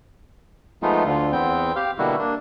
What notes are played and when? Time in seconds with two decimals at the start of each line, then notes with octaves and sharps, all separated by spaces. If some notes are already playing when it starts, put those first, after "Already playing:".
0.83 F3 G#3 A3 B3 D#4 F4
1.05 D2 D3 F4
1.32 E2 B3 C4 G5
1.76 G4 F5
1.99 B2 D3 G3 A#3 E4 F#4
2.19 A#3 D4